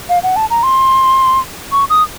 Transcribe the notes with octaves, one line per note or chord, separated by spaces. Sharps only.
F5
F#5
A5
A#5
C6
C#6
D#6